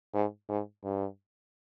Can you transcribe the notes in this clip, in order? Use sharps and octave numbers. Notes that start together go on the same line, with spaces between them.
G#2
G#2
G2